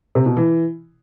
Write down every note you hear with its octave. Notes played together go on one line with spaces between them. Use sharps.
C3
B2
E3